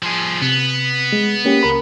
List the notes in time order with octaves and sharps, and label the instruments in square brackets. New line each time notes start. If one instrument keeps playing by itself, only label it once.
[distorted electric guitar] F3 G#4
[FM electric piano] C3 [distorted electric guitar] B3
[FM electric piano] G#3
A#3 C#4 G4
C#2 A#4 B5